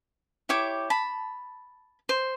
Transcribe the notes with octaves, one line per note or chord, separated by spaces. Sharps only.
E4 G4 C#5 D6
A5 B5
C5